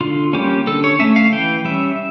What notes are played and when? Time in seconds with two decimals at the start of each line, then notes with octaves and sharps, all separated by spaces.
0.01 D3 F4
0.33 G3 A#3 C#4 G4
0.67 D3 A4
0.84 C#5
0.99 A3 C#4 E5
1.16 F5
1.32 E3 G5
1.65 G3 C#4 E5